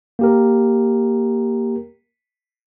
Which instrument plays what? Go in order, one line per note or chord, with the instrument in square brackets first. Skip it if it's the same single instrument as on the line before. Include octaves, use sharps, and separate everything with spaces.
[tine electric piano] A#3 G4 A#4